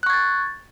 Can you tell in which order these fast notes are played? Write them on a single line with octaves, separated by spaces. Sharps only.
F#6 C#6 G#6 A6